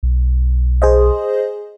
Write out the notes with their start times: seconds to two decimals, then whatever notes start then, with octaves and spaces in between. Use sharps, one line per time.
0.03 B1
0.82 G#4 C5 D#5